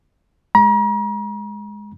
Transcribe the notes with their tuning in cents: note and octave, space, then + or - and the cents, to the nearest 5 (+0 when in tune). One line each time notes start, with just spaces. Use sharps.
G#3 +0 A#5 +40